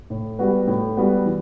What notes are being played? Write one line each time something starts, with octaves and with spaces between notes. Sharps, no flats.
A2
G3 B3 F#4 B4
A2
G3 B3 F#4 B4
E3